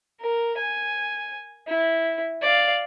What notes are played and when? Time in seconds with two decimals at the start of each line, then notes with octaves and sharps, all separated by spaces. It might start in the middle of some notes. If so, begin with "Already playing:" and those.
0.21 A#4
0.57 G#5
1.67 E4
2.42 D5 F5